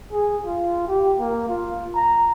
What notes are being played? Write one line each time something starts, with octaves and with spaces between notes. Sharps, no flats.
G#4
F4
G4
A#3
F4
A#5